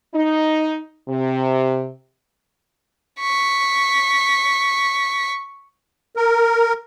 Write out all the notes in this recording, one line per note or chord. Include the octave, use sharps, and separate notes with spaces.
D#4
C3
C#6 B6
A#4